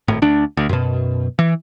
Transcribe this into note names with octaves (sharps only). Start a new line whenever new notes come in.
G#1 A2
D2 D4
D2
F#2 B2
E3